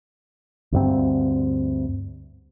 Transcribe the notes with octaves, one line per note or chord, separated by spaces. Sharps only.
D2 G2 C4